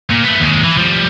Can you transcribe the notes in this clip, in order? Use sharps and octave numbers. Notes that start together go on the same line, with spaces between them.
A#2
A3 B3
D#2 G#3
E3
F3 G3